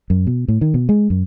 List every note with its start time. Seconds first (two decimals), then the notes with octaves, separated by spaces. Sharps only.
0.10 F#2
0.27 B2
0.48 A2
0.61 D#3
0.74 B2
0.89 G#3
1.10 F#2